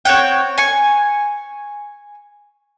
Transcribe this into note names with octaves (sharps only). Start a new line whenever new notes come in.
C4 C#5 F#5 G5
G#5 C#6